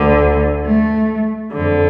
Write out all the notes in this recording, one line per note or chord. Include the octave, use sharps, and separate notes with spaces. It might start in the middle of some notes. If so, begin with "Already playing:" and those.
Already playing: D2 D3
A3
F2 D3